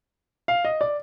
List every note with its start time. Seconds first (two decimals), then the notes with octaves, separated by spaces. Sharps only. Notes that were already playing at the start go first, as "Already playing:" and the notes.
0.48 F5
0.65 D#5
0.81 D5